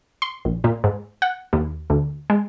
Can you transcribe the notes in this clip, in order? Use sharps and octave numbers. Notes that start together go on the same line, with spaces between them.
C6
A#1
A#2
G#2
F#5
D#2
D2
G#3